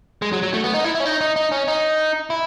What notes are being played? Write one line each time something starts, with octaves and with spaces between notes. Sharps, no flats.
G#3
F#3
F#3
A3
B3
D#4
E4
E4
C#4
D#4
D#4
D#4
C#4
D#4
E4